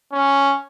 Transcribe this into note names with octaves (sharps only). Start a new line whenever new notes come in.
C#4